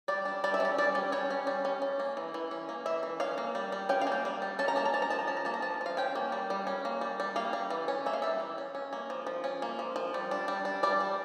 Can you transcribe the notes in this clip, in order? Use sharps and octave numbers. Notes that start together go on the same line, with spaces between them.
G3 D5
D4
G3 D5
E5
C#4 D5
G3 D5
C#4
G3 C#5
C#4
G3
C#4
C#4
A#3
E3
E3
C#4
A#3
E3 E5
E3
C#4 F5
A#3
G3
G3
C#4 G5
F5
A#3
G5
G3
G3
C#4 A5
A#5
A#3 A5
A#5
F3 A5
A#5
F3 A5
A#5
C#4 A5
A#5
A#3 A5
A#5
F3 A5
F3 F5
C#4 G5
A#3
G3
G3
C#4
A#3
G3
G3
A#3 F5
G3
E3
C#4
A#3 E5
F5
G3 E5
E3
C#4
C#4
A#3
F3
F3
C#4
A#3
F3
F3
G3
D4
G3
D4
G3 D5
D4